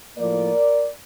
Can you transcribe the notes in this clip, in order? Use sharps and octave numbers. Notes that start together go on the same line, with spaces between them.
A2 F3 A#3 A#4 D5